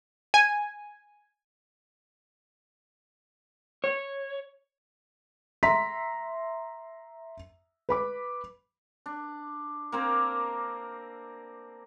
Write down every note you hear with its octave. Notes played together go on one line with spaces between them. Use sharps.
G#5
C#5
E5 A#5 C6 B6
B4 B5 D6
D4
A#3 C4 A#4